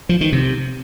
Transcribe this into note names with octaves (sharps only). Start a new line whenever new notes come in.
F3
D#3
C3